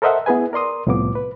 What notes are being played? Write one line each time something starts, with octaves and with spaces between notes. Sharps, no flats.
A4 A#4 C5 D#5 E5 F#5
B3 E4 G#4 B4 G#5
A#4 D5 C6 D#6
C2 A2 C3 F3 B3 D6
B4